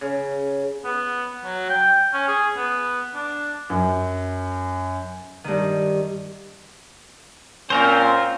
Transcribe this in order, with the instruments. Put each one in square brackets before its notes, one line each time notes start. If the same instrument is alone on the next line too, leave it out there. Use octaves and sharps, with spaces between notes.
[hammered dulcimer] C#3
[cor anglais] B3
F#3
G5
C#4
G#4
B3
D4
[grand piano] F#2
[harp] G2 D#3
[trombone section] A#2 C4 C#4 [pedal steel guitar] F4 A#4 C5